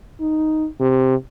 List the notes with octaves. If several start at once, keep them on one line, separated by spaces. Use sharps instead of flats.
D#4
C3